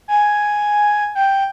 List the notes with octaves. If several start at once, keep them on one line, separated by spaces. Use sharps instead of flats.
G#5
G5